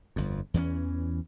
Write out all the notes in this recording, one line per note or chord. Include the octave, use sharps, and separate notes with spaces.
G1 F2
E2 E3 B3 C#4